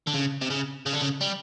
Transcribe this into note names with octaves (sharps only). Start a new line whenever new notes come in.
D3
C#3
C3
C#3
C#3
D3
C#3
G3